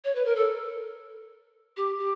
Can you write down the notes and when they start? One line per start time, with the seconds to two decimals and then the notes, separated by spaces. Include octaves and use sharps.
0.04 C#5
0.15 B4
0.25 A#4
0.35 A4
1.76 G4
1.98 G4